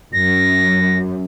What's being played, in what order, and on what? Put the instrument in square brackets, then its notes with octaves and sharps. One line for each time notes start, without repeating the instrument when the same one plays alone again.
[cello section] F#2 [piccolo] A#6